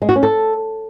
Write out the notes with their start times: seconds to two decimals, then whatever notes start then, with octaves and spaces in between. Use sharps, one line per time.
0.02 G#3
0.09 F#4
0.16 C#4
0.23 A4